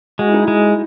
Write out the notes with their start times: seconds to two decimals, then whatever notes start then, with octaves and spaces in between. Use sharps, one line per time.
0.19 G#3 F#4
0.27 E4
0.34 D#4
0.42 E4
0.48 G#3